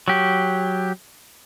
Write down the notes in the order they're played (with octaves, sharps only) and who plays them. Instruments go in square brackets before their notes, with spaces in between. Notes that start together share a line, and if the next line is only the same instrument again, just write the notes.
[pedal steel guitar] F#3 G4